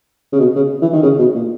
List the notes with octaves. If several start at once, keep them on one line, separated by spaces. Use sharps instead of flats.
C#3
B2
C#3
E3
D#3
C#3
B2
A#2